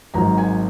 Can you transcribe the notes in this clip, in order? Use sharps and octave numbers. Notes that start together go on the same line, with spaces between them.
G#1 G#2 F#3 A#5
G#5